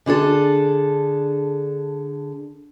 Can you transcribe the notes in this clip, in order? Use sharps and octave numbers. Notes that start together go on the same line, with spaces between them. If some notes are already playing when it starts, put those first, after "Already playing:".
D3 D4 G#4 A4